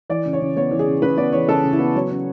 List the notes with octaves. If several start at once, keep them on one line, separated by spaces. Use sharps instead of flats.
E3 D5
C#3
C#5
C#3
B3 C#5
E3
G#4
C#3
C#3 B4
B3 D5
E3 C#5
C#3 A4
C#3
E4
B3
F#3 C#5
C#4